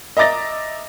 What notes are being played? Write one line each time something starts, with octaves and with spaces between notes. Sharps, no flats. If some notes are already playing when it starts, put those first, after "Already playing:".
D#5 E5 A#5 D6 A6 A#6